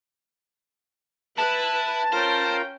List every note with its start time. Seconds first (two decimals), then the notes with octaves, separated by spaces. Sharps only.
1.38 E4 B4 A5
2.12 C#4 F4 A#4 C5 F5 G5